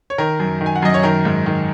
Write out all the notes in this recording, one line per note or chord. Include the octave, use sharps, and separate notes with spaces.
C#5
D#3 A#4
F#2
D#3
G#5
F#5
F#2 D#5
C#5
D#3 A#4
G#2
D#3